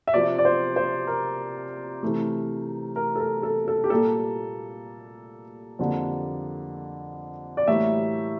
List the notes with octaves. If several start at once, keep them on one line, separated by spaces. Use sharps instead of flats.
E5
C3 F3 C4 D5
D5
C5
C5
A#4
C3 E3 A3
A#4
A4
A#4
A4
A4
G4
A#2 G3 A#3 A4
F2 D3 G3 A#3
D5
A2 E3 G3 A#3 E5